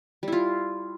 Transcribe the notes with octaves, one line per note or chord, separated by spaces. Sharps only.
G3 E4 F4